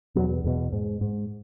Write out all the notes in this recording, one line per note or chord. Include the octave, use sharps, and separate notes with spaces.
E2 B2 F#3
E2 B2
G#2
G#2